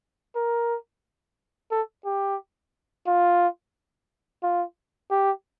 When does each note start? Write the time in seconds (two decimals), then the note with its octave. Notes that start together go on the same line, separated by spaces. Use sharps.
0.36 A#4
1.71 A4
2.05 G4
3.07 F4
4.43 F4
5.11 G4